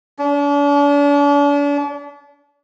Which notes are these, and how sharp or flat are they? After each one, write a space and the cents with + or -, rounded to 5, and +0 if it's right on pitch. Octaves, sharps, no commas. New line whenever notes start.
D4 -40